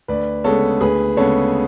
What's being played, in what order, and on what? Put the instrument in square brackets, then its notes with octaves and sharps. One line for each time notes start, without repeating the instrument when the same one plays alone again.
[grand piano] D2 B4 D5
C#3 G#3 B3 A4 C#5
D2 G#4 B4
C#3 G#3 B3 A4 C#5